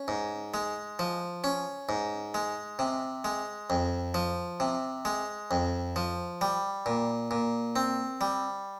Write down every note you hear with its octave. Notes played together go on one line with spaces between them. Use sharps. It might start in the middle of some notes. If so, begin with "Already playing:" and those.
Already playing: C#4
G#2
G#3
F3
C#4
G#2
G#3
C3
G#3
F2
F3
C3
G#3
F2
F3
G3
A#2
A#2
C4
G3